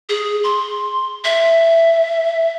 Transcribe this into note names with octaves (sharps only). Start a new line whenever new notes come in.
G#4
C6
E5